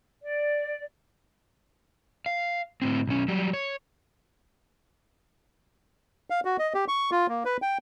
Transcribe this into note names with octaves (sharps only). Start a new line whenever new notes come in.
D5
F5
A2 C4
B1 C#4
F#3 G3
C#5
F5
F#4
D#5
G4
C#6
F4
A#3
B4
G5